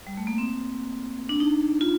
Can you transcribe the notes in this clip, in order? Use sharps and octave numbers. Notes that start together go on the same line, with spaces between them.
G3
A3
A#3
C4
D4
D#4
F4